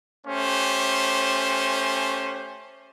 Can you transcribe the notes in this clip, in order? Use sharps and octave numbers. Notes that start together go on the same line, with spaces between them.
A3 C#4 G4 C5